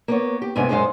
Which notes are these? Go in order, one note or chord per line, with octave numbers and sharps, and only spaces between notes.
A#3 B3 C#5
G4
D#2 G#2 C3 B3 D4 G#5
F#2 A#2 G#3 D#4 C5 F5